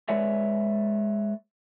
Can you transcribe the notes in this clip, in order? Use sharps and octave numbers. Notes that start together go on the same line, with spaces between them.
G#3 B4 C#5 D5 E5